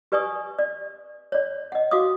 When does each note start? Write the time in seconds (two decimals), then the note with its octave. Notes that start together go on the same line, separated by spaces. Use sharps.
0.12 G4 B4 D5 G#5 C#6 D#6
0.59 D5
1.32 C#5 D5
1.72 D#5 F#5
1.91 F#4 F5 D6 D#6